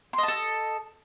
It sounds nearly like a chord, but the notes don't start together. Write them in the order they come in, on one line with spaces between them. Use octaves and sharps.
C6 D#5 A5 A4